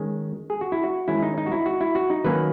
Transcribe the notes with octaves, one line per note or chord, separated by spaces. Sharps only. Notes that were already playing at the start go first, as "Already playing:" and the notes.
Already playing: D#3 G#3 C#4
G#4
F#4
E4
F#4
D#3 G#3 C#4 E4
D#4
D#4
F#4
E4
F#4
E4
F#4
D#4
D#3 F#3 A#3 C#4 B4